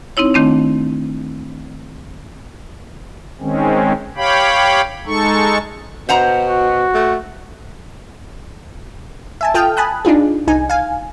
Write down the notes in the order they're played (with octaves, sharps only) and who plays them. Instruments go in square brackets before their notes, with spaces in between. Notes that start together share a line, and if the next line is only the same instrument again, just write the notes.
[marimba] C4 D#4 E4 C#5
D#3 A3 C4 D4
[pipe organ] D#3 G#3 C4 C#4
G4 C#5 F5 G5 B5
G#3 D#4 A4 C#6
[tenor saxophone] B2 [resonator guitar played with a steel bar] C5 F#5 A#5
[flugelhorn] F#4
[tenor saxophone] A3
[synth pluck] E5 G#5 A5
F4 A4 G5 A5 D#6 F6
G#5 A5 B5 D#6 F#6
D4 D#4 F4 G#4
C2 D#4 G#5
F5 G#5